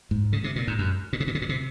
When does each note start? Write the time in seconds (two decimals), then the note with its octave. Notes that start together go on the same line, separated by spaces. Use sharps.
0.11 G#2
0.33 C#3
0.44 C3
0.56 A#2
0.67 G#2
0.79 F#2
1.13 A#2
1.20 C3
1.27 A#2
1.35 C3
1.42 A#2
1.49 C3